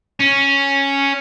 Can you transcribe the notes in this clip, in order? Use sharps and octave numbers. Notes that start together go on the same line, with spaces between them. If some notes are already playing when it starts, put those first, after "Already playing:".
C#4